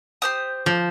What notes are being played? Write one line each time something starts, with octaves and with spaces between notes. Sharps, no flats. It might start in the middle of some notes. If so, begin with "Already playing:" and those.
G4 C5 D#6
F3